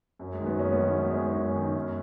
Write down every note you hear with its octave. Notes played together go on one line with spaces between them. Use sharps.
F#2 F#3
G#3
D#3
F#3 B3
F#2 G#3 C#4
F#3 B3
D#3
G#3
F#2 G#3
G#3 C#4
D#3
G#3 C#4
F#2
D#3
F#2